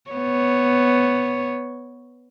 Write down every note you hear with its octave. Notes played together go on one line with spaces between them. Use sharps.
B3 C#5